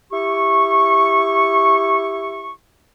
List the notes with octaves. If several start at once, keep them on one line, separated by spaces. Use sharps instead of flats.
E4 G4 C#6